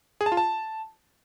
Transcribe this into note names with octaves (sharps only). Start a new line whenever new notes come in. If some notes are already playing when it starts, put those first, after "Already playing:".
G#4
A5
F4
A5